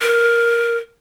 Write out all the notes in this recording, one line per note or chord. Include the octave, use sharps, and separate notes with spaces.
A#4